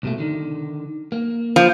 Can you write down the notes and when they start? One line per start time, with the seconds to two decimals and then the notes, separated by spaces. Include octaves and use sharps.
0.03 C2 B2 A3
0.18 D3 D#3
1.12 A#3
1.56 F3